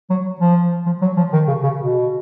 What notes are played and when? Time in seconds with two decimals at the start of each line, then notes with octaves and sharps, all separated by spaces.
0.10 F#3
0.41 F3
0.86 F3
1.02 F#3
1.17 F3
1.33 D#3
1.48 C#3
1.63 C#3
1.79 B2